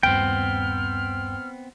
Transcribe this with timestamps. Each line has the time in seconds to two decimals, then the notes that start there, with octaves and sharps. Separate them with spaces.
0.03 D#1 G2 B3 C4 G5 F6